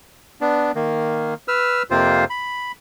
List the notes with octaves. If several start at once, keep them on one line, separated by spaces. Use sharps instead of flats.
B3 D4
D#3 A#3
B4 E6 F6
F2 C3 A#3 C4 F4 C5
B5